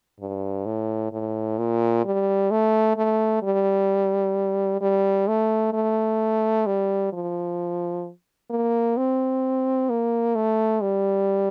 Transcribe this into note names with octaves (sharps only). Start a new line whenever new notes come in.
G2
A2
A2
A#2
G3
A3
A3
G3
G3
A3
A3
G3
F3
A#3
C4
A#3
A3
G3